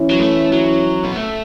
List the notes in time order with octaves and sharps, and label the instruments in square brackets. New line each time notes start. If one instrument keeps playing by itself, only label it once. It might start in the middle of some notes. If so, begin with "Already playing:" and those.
Already playing: [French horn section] E3 C#4 E4
[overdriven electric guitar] F#3
A3
F#3
B3
A3